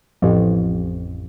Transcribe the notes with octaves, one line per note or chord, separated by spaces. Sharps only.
A1 F2